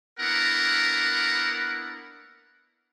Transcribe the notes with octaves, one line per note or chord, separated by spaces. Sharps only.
A#3 B3 D4 E4 A#4 F#5